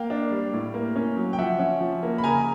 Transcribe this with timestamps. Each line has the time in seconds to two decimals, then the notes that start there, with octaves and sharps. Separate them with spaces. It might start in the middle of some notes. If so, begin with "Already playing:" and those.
Already playing: A#3 F5 G5
0.10 D4
0.31 G3
0.53 A2
0.74 A#3
0.96 C#4
1.17 F#3
1.33 G5
1.38 F3 E5 F#5
1.59 C#4
1.81 F3
2.03 A#3
2.18 B5
2.24 C#3 G#5 A#5